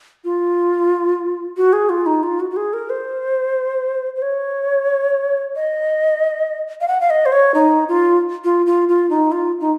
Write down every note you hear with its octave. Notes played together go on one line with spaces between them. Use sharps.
F4
F#4
G#4
F4
D#4
F4
F#4
F#4
G#4
A#4
C5
C5
C#5
D#5
F5
F#5
F5
D#5
C5
C#5
D#4
F4
F4
F4
F4
D#4
F4
D#4